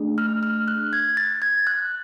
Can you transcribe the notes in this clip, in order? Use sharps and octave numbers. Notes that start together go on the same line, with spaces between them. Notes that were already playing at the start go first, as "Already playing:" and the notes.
Already playing: A3 D4 G#4
F6
F6
F#6
G#6
A6
G#6
F#6